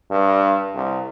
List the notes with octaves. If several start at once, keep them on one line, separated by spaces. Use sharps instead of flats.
G2
C2